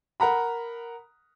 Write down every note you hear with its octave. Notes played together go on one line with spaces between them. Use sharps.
A#4 F#5 A#5 B5